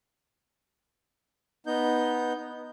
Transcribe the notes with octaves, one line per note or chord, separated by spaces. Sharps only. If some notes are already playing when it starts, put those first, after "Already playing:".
B3 D#4 G6